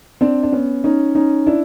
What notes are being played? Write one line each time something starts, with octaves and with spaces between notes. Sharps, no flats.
C4 D4
D4
B3 C#4
C#4 D#4
C#4 D#4
D4 E4